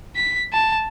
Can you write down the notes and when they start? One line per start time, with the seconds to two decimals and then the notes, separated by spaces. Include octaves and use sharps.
0.15 B6
0.53 A5